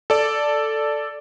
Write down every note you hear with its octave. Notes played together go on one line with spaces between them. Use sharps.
A4 D5